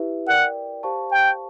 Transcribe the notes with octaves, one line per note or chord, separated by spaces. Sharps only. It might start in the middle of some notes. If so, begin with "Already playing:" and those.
Already playing: E4 G4 B4 E5
A#4 D5 F#5 G5
G4 C5 F5 A5 C#6
G5